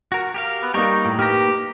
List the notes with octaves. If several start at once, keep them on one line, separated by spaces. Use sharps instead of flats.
F#4 A#4
G4 A#4 F5
B3
G3 A#3 D#4 G5 A#5 C#6
A2
A#3 D#4 G4 B4 F6 A#6